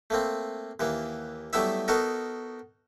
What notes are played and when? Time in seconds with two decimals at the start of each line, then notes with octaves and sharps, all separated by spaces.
0.10 A3 A#3 C4
0.80 D#2 E3 A#3
1.53 F#3 G3 A3 B3 E4 E5
1.88 B3 D#4 F#4 A4 A#4